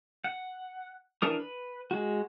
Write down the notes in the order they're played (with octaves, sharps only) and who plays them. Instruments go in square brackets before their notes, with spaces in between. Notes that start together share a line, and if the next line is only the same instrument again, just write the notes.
[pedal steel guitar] F#5
E3 D4 A#4 D#6
B4
G#3 F#4